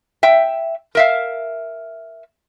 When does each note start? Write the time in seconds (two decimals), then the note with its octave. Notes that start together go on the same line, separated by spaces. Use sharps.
0.23 E5 G5
0.95 A#4 E5 F5